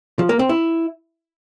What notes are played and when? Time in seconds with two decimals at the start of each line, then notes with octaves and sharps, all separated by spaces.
0.19 F3
0.29 A#3
0.39 C4
0.49 E4